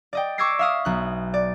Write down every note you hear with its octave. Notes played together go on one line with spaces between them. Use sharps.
D5 D#5 G5
C#6 D6 E6 G#6 A#6 C7
E5 F5 D#6
B1 F#6
D5